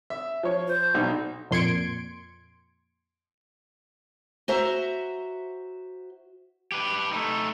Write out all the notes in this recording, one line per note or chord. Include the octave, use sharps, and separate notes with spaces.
E5
F3 C#5
C5
B1 D4 D#4
F2 A#2 C6 G#6 C#7 D7
F#4 C5 E5 A#5
G4 B4
A3 D#4